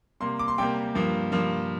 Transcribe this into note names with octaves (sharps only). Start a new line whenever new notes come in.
C3 G3 A#3 C6
D6
C6
C3 G3 A#3 G5
G2 F3 A#3
G2 F3 A#3